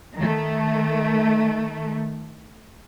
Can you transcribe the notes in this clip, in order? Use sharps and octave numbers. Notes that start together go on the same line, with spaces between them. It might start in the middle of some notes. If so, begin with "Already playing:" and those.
D#3 A3